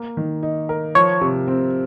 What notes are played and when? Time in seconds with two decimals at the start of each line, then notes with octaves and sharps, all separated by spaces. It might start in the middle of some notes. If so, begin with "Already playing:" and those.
Already playing: A#3
0.17 D#3
0.43 D#4
0.69 A#4
0.95 F3 C#5
1.21 C3
1.48 C4